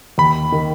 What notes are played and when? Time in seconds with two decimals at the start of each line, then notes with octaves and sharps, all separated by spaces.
0.18 D#2 B5
0.52 D#3